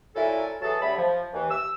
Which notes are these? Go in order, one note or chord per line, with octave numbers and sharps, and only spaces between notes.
A#2 F#3 E4 A4 A#4 G#5
E3 F#3 G#4 A4 A5
D3 G3 A3 C#5 B5
F3
D#2 E3
E6